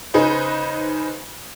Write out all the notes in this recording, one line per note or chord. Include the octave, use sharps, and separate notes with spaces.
C#3 D#4 G#4 B4 C5